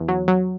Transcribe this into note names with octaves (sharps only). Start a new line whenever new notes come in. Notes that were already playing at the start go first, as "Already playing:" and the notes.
Already playing: E2
F#3
F#3